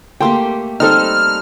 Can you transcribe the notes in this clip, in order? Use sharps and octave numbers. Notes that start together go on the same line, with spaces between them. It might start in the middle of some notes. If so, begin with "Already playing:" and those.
A3 A#3 G4 G5 C6
G3 C4 D#4 A4 D#5 F6